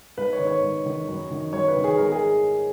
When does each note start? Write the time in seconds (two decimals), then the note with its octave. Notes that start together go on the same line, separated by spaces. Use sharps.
0.18 G#2 B4
0.33 C#5
0.40 D#3
0.47 C#5
0.62 G#2
0.86 D#3
1.09 F#2
1.31 D#3
1.53 F#2 C#5
1.68 B4
1.77 D#3
1.84 G#4
1.97 G#2 A#4
2.12 G#4